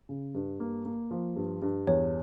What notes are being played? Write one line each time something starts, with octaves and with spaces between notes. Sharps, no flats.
C#3
G2
A#3
A#3
F3
G2
G2
E2 C#5